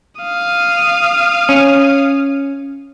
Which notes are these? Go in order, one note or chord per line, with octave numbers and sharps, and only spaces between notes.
F5 D#6
C#4